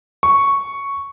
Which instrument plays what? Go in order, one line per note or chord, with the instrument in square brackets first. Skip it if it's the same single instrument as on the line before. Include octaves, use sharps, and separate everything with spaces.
[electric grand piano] C#6